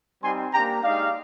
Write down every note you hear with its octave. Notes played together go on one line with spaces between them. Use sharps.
G3 C4 D#4 G4 G#5 C6
A#3 D4 G4 G5 A#5
G#3 D#4 G4 D5 F5